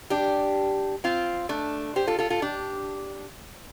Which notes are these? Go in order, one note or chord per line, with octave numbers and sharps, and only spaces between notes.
D4 G4
C4 F4
A3 D4
G4 C5
F4 A4
F4 A4
F4 A4
D4 G4